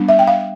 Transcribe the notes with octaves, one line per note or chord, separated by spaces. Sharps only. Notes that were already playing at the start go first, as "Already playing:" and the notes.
Already playing: G3 B3 D4
E5
G5
F5